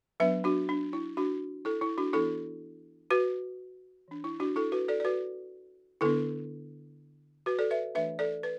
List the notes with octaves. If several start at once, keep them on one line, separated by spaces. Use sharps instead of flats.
F#3 B3 D4 B4 E5
D4 F#4
D4
E4
D4 F#4
E4 A4
E4
D4 F#4
E3 B3 D4 E4 A4
F#4 B4
E3 D4
E4
D4 F#4
E4 A4
F#4 B4
A4 D5
D5
F#4 B4
D3 B3 D4 E4 A4
F#4 B4
A4 D5
B4 E5
E3 A3 D4 B4 E5
A4 D5
B4